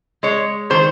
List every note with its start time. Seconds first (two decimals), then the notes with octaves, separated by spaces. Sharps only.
0.23 G#3 C#5
0.70 D#3 C5